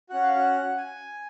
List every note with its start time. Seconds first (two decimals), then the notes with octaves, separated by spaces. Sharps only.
0.09 C#4 F#4 F#5
0.23 F5
0.36 F#5
0.77 G#5